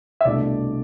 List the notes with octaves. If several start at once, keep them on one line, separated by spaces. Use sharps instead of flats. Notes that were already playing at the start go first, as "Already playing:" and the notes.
E5
C2 B2 A3 D4 D5